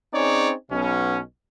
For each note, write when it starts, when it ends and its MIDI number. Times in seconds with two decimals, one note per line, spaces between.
0.14 0.53 60
0.14 0.53 61
0.14 0.53 63
0.14 0.53 68
0.14 0.53 73
0.14 0.53 74
0.71 1.20 35
0.71 1.20 47
0.71 1.20 61